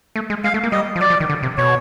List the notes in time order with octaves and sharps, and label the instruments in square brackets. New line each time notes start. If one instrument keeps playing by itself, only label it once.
[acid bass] A3
G#3
[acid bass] G#3 [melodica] F5
[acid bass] A3
A#3
[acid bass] G3 [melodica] D#5
[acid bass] F3
[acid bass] F#3 [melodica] D5
[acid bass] F3
D#3
D3
C3
[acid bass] B2 [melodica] C#5